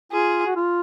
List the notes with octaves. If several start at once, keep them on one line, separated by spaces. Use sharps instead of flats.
F4 G#4
F#4
F4